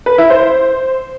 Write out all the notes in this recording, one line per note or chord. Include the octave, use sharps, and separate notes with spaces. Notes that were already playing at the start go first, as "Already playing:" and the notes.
B4
E4
C5